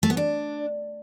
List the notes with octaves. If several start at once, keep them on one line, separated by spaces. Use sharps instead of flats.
A3
B3
D4